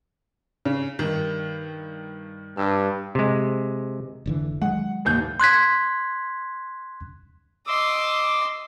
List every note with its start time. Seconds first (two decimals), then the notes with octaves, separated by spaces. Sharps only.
0.65 C#3
0.99 G2 D#3
2.57 G2 E6
3.15 C3 G#3
4.26 F1 D3 E3
4.62 D#3 F#3 G#3 F#5
5.05 A1 D#2 G6
5.40 C6 F#6 G#6 B6
7.67 D#5 C6 D6 E6